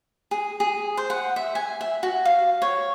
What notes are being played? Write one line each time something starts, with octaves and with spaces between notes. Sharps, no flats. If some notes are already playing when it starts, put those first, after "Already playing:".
G#4
G#4
C5
F#5
E5
G#5
E5
F#4
F5
C#5